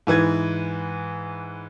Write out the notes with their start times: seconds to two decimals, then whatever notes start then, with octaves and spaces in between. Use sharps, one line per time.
0.07 G#2 E3 B4 G#6